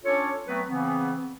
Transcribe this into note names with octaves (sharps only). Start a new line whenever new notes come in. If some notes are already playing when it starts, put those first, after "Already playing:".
C#4 D4 F4 A4 C#5
F#3 A3 B3 C4 B4
C#3 E3 B3 C4